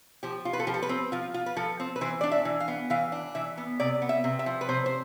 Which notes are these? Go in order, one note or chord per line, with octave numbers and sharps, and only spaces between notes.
F3 G4
F4
B4
A4
F3 G4
A4
B4
C4
F3 F4
F4
B4
F3 A4
C4
B4
E3 C5
D4 D5
E5
E3
F5
B3
E3 F5
D4
E3 E5
B3
C3 D5
B3
E5
C3
E5
F3
B4
C3 C5
C5